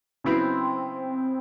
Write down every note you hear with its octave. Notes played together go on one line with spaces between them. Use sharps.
C#3 F#3 B3 C4 E4